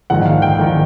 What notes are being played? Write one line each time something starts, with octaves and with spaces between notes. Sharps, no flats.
A#1 G#2 D#3 F#5
F5
G5
A#1 G#2 D#3